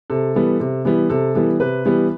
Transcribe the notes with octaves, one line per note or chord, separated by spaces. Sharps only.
C3 A4
E3 G3 B3
C3
E3 G3 B3
C3 A4
E3 G3 B3
C3 B4
E3 G3 B3